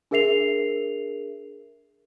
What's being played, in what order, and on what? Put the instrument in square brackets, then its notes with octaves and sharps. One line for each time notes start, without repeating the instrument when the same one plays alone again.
[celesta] D4 G#4 A#4 E5 C7 F7